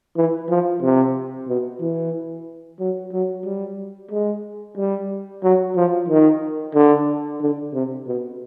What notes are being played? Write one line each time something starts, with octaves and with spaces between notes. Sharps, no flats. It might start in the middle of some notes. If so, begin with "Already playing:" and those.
E3
F3
C3
B2
E3
F#3
F#3
G3
G#3
G3
F#3
F3
D#3
D3
D3
C3
B2